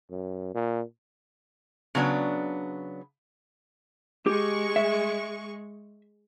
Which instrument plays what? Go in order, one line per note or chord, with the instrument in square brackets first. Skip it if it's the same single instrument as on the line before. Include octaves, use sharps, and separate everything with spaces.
[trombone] F#2
A#2
[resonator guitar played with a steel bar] C#3 F#3 B3 D4
[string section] G#3 C#6 [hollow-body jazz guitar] G4
[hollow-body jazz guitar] E5